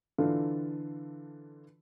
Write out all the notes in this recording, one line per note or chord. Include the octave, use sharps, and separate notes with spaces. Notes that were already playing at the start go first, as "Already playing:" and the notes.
D3 E3 D4 F4 A4